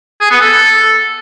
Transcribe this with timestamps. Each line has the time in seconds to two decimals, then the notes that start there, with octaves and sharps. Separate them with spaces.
0.21 G#4
0.31 B3
0.41 A4